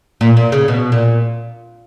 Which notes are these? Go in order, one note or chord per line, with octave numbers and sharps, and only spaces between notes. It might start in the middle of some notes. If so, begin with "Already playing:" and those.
A#2
A#2
C#3
B2
A#2